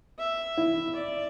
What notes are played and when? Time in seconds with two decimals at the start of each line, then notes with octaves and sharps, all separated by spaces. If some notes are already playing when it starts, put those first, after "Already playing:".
0.19 E5
0.57 E4
0.95 D5